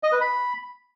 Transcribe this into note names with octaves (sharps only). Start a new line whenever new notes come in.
D#5
B4
B5